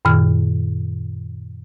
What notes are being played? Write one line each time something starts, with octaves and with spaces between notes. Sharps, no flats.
F#2 A#2 D#3 F6